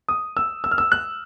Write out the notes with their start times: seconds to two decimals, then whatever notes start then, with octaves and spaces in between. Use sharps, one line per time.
0.09 D#6
0.37 E6
0.64 E6
0.71 F6
0.78 E6
0.92 F#6